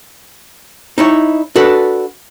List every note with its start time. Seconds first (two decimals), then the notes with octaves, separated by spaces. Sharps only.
0.98 D#4 E4 C#5
1.56 D4 F#4 A4 B4